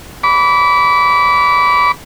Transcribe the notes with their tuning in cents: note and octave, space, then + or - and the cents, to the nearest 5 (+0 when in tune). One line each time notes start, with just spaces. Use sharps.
B5 +0 D6 -30